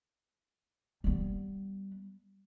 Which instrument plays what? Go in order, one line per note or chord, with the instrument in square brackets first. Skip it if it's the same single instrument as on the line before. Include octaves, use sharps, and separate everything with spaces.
[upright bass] G3 B3